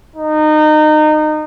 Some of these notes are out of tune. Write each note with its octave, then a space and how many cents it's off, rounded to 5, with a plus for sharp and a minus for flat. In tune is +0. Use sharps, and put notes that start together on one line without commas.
D#4 -25